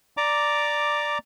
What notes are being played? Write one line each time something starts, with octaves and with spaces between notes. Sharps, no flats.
D5 A#5 D6